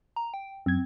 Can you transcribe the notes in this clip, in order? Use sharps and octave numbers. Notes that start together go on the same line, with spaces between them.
A#5
G5
F#2 C4 G#6